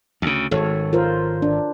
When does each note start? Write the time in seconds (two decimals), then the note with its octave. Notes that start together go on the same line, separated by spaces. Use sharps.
0.22 D2 C#3
0.51 G#1 A4 C#5
0.93 F4 A#4 C5
1.42 D4